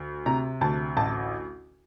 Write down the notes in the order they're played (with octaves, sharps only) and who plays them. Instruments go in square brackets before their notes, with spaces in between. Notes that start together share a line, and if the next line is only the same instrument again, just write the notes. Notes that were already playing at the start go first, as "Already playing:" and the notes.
Already playing: [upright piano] D2
C3 A#5
D2 A5
A1 A5